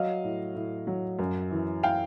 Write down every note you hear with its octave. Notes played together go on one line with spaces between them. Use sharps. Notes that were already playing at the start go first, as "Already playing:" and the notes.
Already playing: F#3 D#5 F5
A2
A2
F#3
F#2
E3
F5 G5